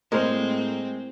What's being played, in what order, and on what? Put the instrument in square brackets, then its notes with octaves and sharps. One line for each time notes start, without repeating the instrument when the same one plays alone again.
[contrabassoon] A2 [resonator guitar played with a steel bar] G#3 [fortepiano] A#3 A#4 C5 [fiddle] C4